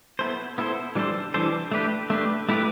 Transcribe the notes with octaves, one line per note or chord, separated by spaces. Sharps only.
B3 E4 A4 C5
B3 E4 A4 C5
E3 G3 D4 A4 C5
E3 G3 D4 A4 C5
A3 D4 G4 B4
A3 D4 G4 B4
A3 E4 G4 B4